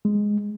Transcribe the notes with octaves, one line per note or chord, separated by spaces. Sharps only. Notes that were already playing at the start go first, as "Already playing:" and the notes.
G#3